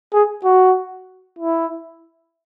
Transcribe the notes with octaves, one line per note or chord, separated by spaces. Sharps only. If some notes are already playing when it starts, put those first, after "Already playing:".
G#4
F#4
E4